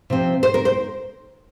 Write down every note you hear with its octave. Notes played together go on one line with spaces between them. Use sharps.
C3 F3 C4
C5
A#4
C5